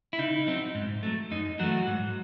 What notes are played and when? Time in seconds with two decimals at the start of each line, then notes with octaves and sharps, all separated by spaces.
0.13 E4
0.19 C#3 D#4
0.47 F#3 C4 D#4
0.75 G#2
1.03 F#3 A3
1.31 F#2 D#4
1.59 E3 F#3 A3 F#4
1.87 G#2